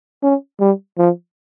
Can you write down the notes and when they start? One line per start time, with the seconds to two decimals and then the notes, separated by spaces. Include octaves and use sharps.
0.23 C#4
0.60 G3
0.98 F3